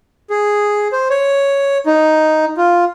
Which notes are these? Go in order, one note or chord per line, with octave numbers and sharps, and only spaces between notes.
G#4
C5
C#5
D#4
F4